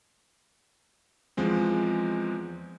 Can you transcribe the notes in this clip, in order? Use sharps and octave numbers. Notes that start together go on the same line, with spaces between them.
E2 F3 G#3 C4